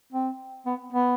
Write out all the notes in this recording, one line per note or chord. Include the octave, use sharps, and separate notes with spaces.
C4
B3
B3